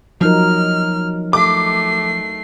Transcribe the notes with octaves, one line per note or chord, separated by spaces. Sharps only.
F3 F#3 D#4 A#4 F6
A3 D6 C7